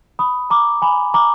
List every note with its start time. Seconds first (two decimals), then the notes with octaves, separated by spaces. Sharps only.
0.19 B5 D#6
0.50 A#5 D6
0.82 G#5 B5
1.14 A#5 D6